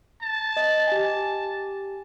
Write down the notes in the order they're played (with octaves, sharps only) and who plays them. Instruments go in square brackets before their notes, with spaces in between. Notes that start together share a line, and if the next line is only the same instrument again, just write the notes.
[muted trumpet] A5
[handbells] D#5
G4 G#5